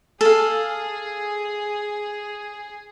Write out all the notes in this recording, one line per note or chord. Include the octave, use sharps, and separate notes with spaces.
G#4 A4 F5